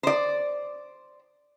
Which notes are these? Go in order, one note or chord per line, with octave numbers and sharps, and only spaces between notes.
C5 D5